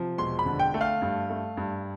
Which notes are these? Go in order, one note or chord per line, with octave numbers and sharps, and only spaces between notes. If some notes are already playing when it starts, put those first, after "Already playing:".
Already playing: C3 F3
E1 C6
B5
D3
G5
A3
F5
G2
A3
G2